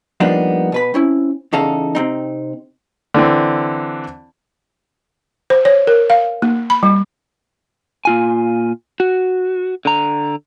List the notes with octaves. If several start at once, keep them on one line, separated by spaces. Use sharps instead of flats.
F3 G3 A#3 B3 D4 D#4
B2 B4 B5
C4 C#4 E4
E2 C#3 D#4 A4 F5
C3 C4 D#4
D3 E3 C4
C5
C#5
A#4
F5
A#3
B5
G3
A#2 F4 G#5
F#4
D3 A#5